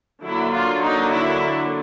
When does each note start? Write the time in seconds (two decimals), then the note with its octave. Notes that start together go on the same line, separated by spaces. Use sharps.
0.23 D3 F#3 A#3 D4 E4
0.53 F4
0.84 D#4
1.13 E4